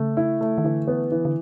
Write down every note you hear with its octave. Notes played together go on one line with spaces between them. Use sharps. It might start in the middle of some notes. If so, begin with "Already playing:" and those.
Already playing: C#3 A3
E4
A3
D#3
D3 E3
B3
E3
D3